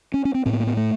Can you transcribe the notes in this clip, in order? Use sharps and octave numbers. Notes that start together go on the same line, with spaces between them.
C#4
C#4
C4
A2 C4
B3
A#3
B3
A3